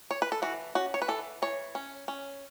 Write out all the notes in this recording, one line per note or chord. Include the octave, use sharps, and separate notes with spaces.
C#5
B4
A4
E3 F#4
C#4 F#4
C#5
B4
E3 A4
E3 C#5
C#4
C#4